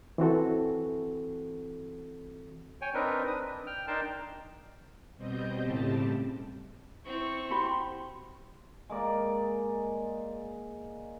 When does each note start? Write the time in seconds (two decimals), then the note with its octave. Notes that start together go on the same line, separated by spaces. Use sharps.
0.18 E3 C4 F#4 A4
2.82 C#5 G5 G#5
2.94 C4 D4 D#4 A#4 B4
3.27 B4 D#6
3.47 D4
3.66 G5 F6
3.88 D4 D#4 A#4 G5 A5 C6
5.17 B2 G3 C4 D#5 G6
5.61 A2 C#3 G3 C4 G4 A5
7.06 C4 E4 C#6
7.50 F#4 G4 B5 C6
8.90 G#3 A#3 D5